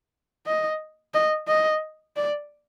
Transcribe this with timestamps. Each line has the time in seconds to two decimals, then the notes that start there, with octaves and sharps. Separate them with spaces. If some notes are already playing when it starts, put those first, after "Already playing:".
0.47 D#5
1.14 D#5
1.48 D#5
2.16 D5